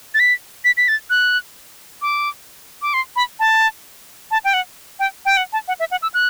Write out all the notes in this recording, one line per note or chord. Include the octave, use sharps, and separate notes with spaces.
A6
B6
B6
B6
A6
F#6
D6
D6
C6
B5
A5
A5
G5
F#5
G5
G5
F#5
A5
F#5
E5
F#5
E6
F#6